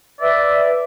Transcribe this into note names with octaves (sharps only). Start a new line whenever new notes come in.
B4 D5 E5